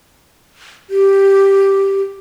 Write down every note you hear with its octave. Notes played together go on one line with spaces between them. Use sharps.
G4